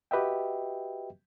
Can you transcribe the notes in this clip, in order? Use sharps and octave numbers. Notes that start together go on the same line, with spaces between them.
F#4 G4 B4 D#5 E5 G5